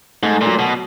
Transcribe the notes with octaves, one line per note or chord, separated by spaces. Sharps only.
G#2 A3
A#2
F#3
B2